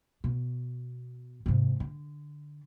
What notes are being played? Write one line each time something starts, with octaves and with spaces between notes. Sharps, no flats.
B2
G#2 C3
D3